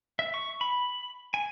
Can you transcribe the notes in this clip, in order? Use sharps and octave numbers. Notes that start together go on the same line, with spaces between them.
E5
C#6
B5
G#5